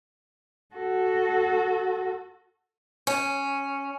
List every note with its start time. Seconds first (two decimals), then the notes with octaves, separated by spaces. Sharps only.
0.75 F#4 A4
3.07 C#4